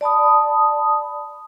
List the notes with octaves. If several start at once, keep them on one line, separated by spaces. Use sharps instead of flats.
D5 A5 B5 D#6